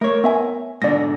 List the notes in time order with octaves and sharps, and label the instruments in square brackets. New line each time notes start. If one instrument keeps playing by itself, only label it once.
[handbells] A3 [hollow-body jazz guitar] A#4 C#5
[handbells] B3 E5 G#5
[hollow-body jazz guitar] G#2 B2 D3 [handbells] D5 A#6